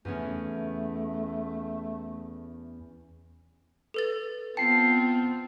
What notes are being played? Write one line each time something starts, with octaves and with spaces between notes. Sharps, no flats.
E2 A3 B3 C#4
A4 B4 A6
B3 C4 F4 G5 A5 C7